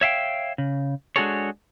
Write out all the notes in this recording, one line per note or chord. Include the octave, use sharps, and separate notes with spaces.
C#5 E5 F5 G5
C#3
G#3 D4 F#4 G#4 A4 C#5